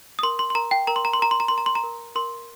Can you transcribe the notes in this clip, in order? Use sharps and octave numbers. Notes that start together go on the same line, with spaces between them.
D#6
A#4 C6
C6
C6
A#4 A#5
G5
A#4 A#5
C6
A#5
C6
A#4 A#5
C6
A#5
A#4 C6
A#5
C6
A#5
A#4
A#4 C6